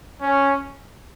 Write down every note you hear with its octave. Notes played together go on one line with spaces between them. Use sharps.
C#4